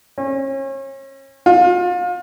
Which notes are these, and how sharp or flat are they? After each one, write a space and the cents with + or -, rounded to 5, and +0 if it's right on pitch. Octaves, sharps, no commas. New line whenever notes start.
C#4 -35
F4 +35